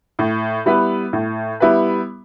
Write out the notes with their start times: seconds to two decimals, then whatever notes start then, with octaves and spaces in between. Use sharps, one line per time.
0.19 A2
0.66 G3 B3 E4 B4
1.13 A2
1.60 G3 B3 E4 B4